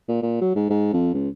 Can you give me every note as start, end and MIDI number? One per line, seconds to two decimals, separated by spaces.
0.09 0.22 46
0.22 0.39 46
0.41 0.52 54
0.56 0.68 44
0.70 0.92 44
0.93 1.13 41
1.14 1.29 37